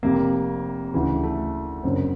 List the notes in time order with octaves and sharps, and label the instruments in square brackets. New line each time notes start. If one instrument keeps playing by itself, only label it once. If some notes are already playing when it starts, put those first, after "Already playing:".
[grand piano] F1 F2 C3 A#3
D2 C#3 E3
A3
F#1 F#2 D3 C4